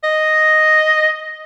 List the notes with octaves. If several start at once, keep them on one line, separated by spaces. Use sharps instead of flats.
D#5